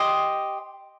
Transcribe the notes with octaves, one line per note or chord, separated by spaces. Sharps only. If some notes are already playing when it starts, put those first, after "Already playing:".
Already playing: G4 C5 D#5 C6